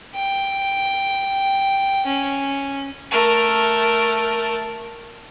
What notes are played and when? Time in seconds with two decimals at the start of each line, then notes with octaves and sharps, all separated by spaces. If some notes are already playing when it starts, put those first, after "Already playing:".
0.15 G5
2.07 C#4
3.11 A3 A#4